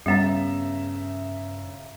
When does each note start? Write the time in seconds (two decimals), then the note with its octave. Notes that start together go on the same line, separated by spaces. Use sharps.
0.06 G2 C#3 G3 B3 E5 A#5